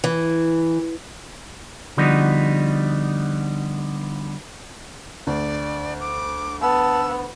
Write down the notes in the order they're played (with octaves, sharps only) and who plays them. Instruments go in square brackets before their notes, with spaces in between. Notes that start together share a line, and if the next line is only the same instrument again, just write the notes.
[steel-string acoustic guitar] E3
[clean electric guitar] D3 F3 G3 B3 D#4 F#4
[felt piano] D2 [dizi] D5
[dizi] D6
[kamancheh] B3 [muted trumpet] A5 [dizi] E6